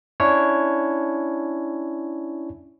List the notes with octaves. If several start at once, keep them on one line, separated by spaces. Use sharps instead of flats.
C#4 D4 E4 C#5